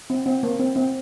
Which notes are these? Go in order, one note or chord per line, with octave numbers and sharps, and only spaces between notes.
C4
C4
A#3
C4
C4